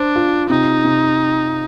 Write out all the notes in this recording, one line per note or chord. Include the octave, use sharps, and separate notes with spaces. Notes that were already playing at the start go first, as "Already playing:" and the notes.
Already playing: D4 C5
F4
C3 D#4
C3